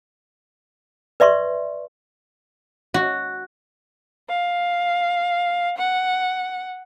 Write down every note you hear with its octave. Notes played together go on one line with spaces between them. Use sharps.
B4 D5 E5 C6 C#6
F#4
F5
F#5